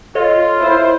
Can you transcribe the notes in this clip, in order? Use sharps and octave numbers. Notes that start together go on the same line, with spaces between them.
F4 A4 C#5 D#5
E4 C5